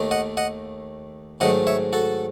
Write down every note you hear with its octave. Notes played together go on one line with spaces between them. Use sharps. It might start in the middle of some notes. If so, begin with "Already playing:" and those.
Already playing: D#2 D#3 A3 D#4
D#5 F#5
D#5 F#5
G#2 D#3 F#3 A3 D#5 F#5
C#5 E5
F#4 A4